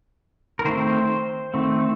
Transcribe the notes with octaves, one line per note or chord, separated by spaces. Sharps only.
A#4
D#3 A3 C4 C5
D#3 A3 C4